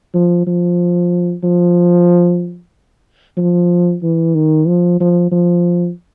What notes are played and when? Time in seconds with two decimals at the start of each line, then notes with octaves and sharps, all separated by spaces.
0.14 F3
0.47 F3
1.44 F3
3.37 F3
4.03 E3
4.35 D#3
4.67 F3
5.00 F3
5.32 F3